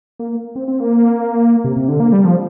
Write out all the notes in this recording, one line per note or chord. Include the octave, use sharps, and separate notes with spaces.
A#3
C4
C4
A#3
C3
C3
D3
A#3
G3
F3